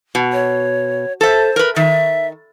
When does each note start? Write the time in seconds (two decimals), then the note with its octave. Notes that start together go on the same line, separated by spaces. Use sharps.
0.15 B2
0.33 C#5
1.21 A4 C5 E5
1.56 A#4 B4
1.76 D#3 E5